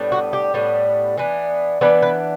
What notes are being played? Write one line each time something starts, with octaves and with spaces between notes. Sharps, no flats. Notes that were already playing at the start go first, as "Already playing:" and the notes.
Already playing: A2 G3 B3 D4
F#4
G4
A2 G3 B3 D4
E3 B3 D4
E3 B3 D4 B4
B4